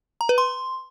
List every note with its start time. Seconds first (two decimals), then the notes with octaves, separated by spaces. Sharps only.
0.21 A#5
0.29 B4
0.38 C6